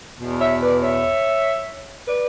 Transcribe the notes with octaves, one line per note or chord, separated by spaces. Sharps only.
E2 B2
C#5 E5
B4 D5
C#5 E5
B4 D5